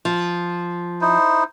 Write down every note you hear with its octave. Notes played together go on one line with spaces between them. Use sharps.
F3
D#4 E4 C5